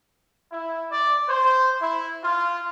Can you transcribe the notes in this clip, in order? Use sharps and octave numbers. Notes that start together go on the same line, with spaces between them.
E4
D5
C5
E4
F4